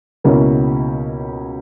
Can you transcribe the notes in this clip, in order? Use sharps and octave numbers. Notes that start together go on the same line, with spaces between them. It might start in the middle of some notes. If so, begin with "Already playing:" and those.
C#2 B2 A#3 C#4 E4